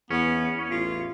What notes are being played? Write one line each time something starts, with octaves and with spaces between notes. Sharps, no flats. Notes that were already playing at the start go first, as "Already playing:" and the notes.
E2 B3 C#4
A1 F4